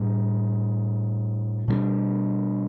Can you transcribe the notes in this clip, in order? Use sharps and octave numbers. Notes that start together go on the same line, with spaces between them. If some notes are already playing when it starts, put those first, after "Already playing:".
Already playing: A2 G3 D4
B2 G3 B3 D4